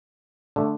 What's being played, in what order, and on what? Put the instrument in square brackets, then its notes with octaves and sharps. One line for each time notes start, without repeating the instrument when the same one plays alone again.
[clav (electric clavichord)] D3 A3